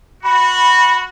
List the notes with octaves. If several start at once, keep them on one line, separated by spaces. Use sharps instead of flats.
F#4 B5